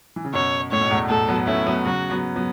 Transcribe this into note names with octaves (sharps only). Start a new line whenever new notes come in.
E3
C#3
F#2 B2 C#5
A2 C#5
B2
E2 A2
E2 A2 A4
F#3 B3
A3 C#4 E4
F#3 B3
C#3 F#3 F#4
F#3 B3
F#3 B3